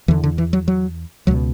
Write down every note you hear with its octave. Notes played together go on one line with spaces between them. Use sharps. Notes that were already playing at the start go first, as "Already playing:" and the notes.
E2 D3 E3
D3
E3
F#3
F#3
C#2 B2 F#3